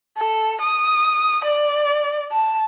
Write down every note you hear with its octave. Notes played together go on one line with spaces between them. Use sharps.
A4
D#6
D5
A5